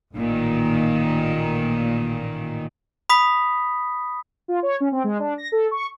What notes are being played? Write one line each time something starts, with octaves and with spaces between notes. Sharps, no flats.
A1 A#2 D#3
B5 D#6 B6
F4
C#5
C#4
C4
G#3
D4
A#6
A4
C#6